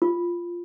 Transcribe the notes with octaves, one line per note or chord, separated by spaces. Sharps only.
F4